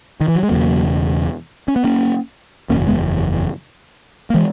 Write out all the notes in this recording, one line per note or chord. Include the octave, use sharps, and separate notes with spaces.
D#3
E3
F#3
G#3
E1 E2 C#3 F#3 A#3
C#4
B3
A#3 C#4
F#1 E2 B2 A#3 C#4
G#3 B3
A#3
E3 G#3